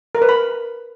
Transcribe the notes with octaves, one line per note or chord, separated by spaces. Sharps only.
A#4
B4
B5